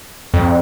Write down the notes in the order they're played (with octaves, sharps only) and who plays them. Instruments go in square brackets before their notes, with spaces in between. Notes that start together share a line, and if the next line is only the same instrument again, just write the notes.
[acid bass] F2